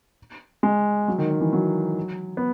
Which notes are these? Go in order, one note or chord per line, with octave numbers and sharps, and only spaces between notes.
G#3
F#3
D#3
D#3
E3
F#3
B3